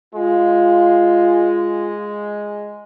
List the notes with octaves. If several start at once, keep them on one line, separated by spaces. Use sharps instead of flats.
G#3 F4